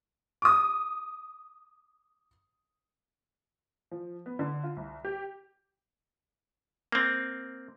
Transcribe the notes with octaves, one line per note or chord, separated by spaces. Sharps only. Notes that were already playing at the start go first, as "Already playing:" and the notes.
D6 D#6
F3
B3
D3
F4
C2
G4
A#3 C4